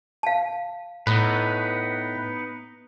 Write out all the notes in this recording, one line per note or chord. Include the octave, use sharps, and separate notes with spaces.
F5 A5
A2 B3 D#4 B4